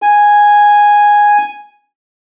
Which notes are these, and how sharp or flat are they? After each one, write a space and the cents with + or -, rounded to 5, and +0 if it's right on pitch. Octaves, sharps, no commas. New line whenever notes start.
G#5 -5